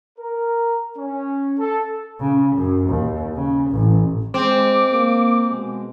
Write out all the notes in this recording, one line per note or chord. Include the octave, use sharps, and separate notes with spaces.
A#4
C#4
A4
C#3
F#2
D#2
C#3
A1
G#3 C4 D6
A#3
B2 G#3